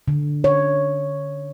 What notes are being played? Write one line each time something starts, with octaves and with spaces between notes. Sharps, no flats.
D3
C#5